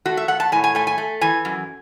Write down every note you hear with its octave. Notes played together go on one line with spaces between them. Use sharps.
A3 F#4
E5
A3 F#5
A5
A2 G#5
G#5
A3 G#5
G#5
A3
E3 G#5
F#2